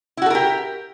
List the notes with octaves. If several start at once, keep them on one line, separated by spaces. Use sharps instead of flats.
E4 F#4 G4 A4 A#4